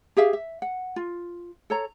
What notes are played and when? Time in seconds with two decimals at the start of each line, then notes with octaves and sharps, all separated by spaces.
0.17 G4 G#4 E5 F5
0.33 E5
0.62 F#5
0.96 F4
1.70 A4 C#5 A#5